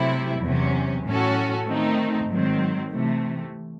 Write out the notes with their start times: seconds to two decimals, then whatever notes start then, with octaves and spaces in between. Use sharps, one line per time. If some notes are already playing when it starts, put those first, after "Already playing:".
Already playing: C3 F#3 A3 C4 E4
0.43 E2 C3 F#3 C#4
1.05 A2 F#3 C#4 F#4 A4
1.68 D#3 A3 C4 D#4
2.29 G#2 D#3 F#3 C4
2.91 C3 E3 A3